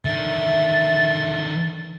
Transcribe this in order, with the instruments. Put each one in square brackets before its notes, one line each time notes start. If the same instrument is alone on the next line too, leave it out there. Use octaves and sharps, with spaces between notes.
[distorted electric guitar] D3 D#3 [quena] E5 [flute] A6